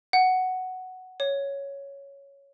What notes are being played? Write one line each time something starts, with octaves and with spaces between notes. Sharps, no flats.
F#5
C#5